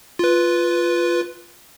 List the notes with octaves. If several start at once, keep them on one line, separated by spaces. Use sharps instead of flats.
F4 B4